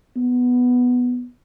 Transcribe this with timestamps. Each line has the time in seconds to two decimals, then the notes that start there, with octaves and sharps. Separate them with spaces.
0.17 B3